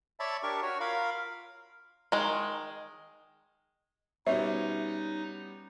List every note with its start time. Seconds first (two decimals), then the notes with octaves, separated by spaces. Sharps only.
0.20 C#5 D5 E5 A5 B5
0.43 D4 G4 A#4 C#6
0.62 F#4 C#5
0.80 F4 A#4 F5 B5
2.12 D#3 G#3
4.27 B2 G3 B3 C#4 D#4 C#5 E5